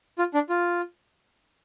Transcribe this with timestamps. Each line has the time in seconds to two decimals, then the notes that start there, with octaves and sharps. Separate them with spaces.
0.19 F4
0.34 D4
0.49 F4